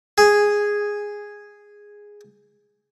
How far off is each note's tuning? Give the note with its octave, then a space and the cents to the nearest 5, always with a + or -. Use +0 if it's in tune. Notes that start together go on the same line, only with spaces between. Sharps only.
G#4 -5